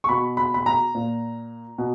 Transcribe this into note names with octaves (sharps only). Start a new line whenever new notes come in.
C#6
B2 B5
B5
B5
A#5
A#2
B2